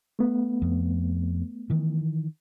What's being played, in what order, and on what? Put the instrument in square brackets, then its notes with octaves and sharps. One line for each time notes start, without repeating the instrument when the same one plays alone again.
[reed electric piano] A3 B3
[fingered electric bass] F2
D#3 E3